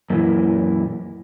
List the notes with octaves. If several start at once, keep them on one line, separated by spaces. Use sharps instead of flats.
F#2 A#2 E3